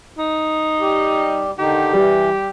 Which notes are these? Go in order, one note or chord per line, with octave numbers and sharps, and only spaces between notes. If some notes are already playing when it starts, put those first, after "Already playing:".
D#4
G3 G4
D3 D#3 D#4 G4
E3 G3